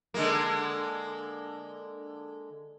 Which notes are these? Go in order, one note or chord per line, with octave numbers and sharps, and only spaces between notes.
D3 G#3 A#3